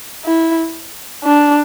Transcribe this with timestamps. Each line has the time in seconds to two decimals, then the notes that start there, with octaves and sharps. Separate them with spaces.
0.25 E4
1.24 D4